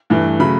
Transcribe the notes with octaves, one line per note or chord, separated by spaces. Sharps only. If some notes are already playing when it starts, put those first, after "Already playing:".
G2 E3 A3
C#3 F#3 A3 B5